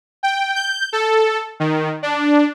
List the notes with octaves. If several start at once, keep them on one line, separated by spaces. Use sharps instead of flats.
G5
G6
A4
D#3
D4